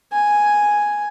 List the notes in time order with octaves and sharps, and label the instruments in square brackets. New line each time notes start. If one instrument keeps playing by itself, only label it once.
[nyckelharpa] G#5